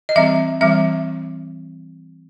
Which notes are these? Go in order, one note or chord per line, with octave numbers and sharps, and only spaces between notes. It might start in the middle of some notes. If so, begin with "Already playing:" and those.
D#5
E3 G3 C4 E5
E3 G3 C4 E5